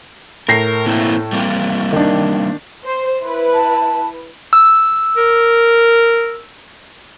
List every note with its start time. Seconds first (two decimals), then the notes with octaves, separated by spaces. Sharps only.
0.49 A2 A#4 A#6 C7
0.86 A#3 C4 E4
1.33 G3 A#3 C4
1.93 D#3 D4
2.85 C5
3.22 E4 B4
3.53 A5
4.53 E6
5.17 A#4